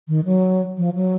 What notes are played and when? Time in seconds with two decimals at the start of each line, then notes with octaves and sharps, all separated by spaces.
0.08 D#3
0.25 F#3
0.78 F3
0.95 F#3